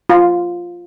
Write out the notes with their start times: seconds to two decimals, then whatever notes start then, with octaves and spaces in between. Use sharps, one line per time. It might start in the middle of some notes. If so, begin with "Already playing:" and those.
0.10 F4